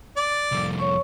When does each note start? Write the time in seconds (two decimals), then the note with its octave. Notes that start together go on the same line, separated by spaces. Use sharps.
0.17 D5
0.52 C2 F2
0.79 C#5 C#6